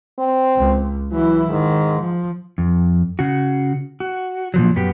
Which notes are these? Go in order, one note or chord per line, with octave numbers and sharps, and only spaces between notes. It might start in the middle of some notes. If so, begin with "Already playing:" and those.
C4
C#2
E3 F#3 E4
G#2 D#3
F3
F2
C#3 F#4
F#4
A#2 F3 F#3
F#2 B3 F#4 G4